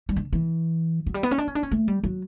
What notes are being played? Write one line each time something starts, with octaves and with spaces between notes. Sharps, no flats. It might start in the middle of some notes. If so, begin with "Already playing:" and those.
G3
D3
E3
F#3
G3
B3
C#4
D4
C#4
D4
C#4
A3
G3
F#3